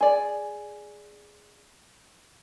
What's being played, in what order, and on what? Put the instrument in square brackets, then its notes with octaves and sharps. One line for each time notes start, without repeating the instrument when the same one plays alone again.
[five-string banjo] G#4 D5